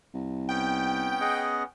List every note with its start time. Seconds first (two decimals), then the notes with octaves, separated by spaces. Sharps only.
0.14 C2
0.49 B3 C#4 G5
1.21 G#4 D#5 F#5